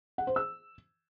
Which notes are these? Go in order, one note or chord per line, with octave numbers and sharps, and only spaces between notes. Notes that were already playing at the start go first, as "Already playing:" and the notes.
F#5
C5
E6